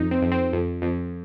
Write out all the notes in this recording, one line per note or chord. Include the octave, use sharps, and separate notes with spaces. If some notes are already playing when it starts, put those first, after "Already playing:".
Already playing: F2 D#4
C4
F2
C4
F2
F2